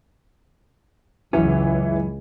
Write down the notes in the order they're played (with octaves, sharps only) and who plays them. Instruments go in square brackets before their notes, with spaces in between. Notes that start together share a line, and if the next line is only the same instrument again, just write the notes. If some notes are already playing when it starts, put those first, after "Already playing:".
[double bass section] C#2 [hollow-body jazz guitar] F#2 C#4 [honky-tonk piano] E3